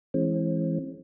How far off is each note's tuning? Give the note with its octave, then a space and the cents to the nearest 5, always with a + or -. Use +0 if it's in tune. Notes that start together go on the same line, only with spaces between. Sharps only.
E3 +0 G#3 +10 C4 +40